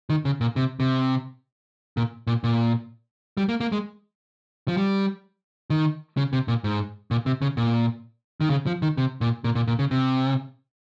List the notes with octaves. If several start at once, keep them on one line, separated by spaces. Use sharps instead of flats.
D#3
C#3
A#2
C3
C3
A#2
A#2
A#2
G3
A#3
A#3
G#3
F3
G3
D#3
C#3
C3
A#2
G#2
A#2
C3
C#3
A#2
D#3
C#3
F3
D#3
C3
A#2
A#2
A#2
A#2
C#3
C3